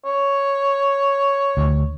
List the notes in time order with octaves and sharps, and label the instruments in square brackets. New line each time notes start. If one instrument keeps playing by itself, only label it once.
[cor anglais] C#5
[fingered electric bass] D2